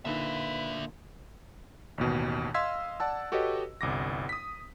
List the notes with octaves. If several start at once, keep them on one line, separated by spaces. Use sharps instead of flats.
A#2 D3 D4 D#4 B4 E5
A1 D#2 B2
D#5 F5 C6 E6 G#6 B6
D5 F#5 A5 E6
F#4 G4 A4 B4 C#5 D#5
G1 C2 D6 A#6
D#6 B6